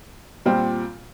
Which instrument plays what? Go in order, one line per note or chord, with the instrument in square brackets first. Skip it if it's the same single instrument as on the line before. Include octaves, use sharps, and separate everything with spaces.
[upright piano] A#2 G3 C4 F4